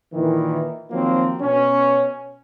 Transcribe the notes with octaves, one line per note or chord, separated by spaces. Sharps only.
A#2 D#3 E3
D#3 F3 F#3 A#3 C4
B2 C#4